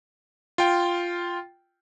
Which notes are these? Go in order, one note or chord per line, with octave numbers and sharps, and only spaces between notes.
F4 G5